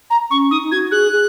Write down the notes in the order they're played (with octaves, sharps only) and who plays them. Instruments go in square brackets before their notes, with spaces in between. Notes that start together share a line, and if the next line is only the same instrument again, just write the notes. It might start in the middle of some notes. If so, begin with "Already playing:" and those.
[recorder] A#5
[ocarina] C#4 [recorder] C#6
[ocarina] D#4 [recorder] D#6
[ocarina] D#4
[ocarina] F#4 [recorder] G#6
[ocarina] G#4 [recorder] F#6
[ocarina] G#4